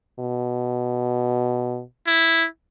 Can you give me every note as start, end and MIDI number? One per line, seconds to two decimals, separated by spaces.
0.19 1.81 47
2.07 2.46 64